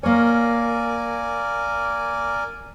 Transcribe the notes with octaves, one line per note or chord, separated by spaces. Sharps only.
A#3 A#4 C#5 D5 G#5